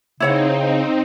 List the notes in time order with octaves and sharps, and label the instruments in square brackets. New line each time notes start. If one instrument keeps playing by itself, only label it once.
[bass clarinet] C#3 [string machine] C4 D#4 [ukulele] E4 C#5 F#5